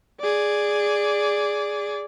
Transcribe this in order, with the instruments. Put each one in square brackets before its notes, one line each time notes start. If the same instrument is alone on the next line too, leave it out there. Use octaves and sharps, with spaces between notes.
[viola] G#4 D5